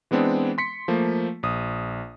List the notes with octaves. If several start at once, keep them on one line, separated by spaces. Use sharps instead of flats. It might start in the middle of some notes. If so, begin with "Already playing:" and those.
E3 G#3 B3 C4 D4
C6 B6 C#7
F3 A3 A#3
A#1 D#6